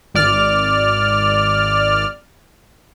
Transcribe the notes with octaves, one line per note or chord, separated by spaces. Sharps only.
G#1 D5 F6